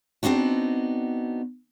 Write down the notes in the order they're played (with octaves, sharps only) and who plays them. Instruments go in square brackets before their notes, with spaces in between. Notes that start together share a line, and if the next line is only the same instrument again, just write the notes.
[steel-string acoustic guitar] B3 C4 D4 D#4 F#4